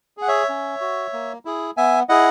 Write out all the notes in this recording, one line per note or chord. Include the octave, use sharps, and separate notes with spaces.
G#4 F#5
C#5 E5
C#4
F#4
A#3
E4 G#4
B3 E5 G#5
E4 G#4 D#5 F#5